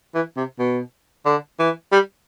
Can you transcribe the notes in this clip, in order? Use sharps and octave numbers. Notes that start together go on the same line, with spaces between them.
E3
C3
B2
D3
E3
G3